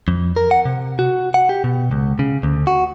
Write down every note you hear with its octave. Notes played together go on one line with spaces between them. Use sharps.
F2
A#4
F#5
C3
F#4
F#5
G4
B2
C#2
C#3
D2
F#4